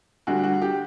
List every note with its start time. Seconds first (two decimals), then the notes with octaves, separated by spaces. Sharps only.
0.27 D2 D3 G3 F#4
0.44 F#4
0.62 G4